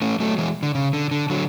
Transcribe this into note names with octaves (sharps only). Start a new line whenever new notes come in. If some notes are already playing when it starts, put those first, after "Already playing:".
A3 C#4
F#3 A3
E3 G#3
D3
C#3
D3
D3
D3 F#3